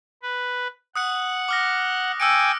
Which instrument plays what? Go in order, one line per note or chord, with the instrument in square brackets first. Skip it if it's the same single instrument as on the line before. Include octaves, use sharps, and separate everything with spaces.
[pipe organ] B4
[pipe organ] F#5 [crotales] D#6 F#6 C#7
[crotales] D6 F6 A#6
[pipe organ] G5 G#5 D6 [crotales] E6 C#7 D7